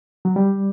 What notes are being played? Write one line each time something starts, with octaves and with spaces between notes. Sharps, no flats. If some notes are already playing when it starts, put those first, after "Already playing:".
F#3
G3